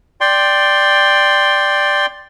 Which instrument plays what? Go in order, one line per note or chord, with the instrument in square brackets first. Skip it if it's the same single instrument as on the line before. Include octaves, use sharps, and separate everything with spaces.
[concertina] D5 G5 C6